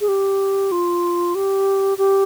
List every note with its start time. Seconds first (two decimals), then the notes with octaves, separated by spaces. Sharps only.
0.01 G#4
0.08 G4
0.71 F4
1.35 G4
1.98 G4